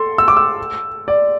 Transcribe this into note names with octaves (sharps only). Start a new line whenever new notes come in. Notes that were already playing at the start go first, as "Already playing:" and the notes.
Already playing: A4 C6
E6
D6
E6
D5